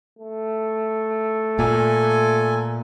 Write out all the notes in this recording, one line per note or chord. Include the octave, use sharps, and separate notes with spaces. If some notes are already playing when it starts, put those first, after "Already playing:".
A3
A#2 A4 G#5